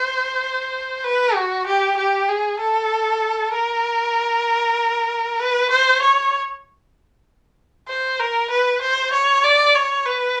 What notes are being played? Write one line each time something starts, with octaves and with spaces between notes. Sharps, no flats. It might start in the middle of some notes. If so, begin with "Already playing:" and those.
Already playing: C5
B4
F#4
G4
G4
G#4
A4
A#4
B4
C5
C#5
C5
A#4
B4
C5
C#5
D5
C#5
B4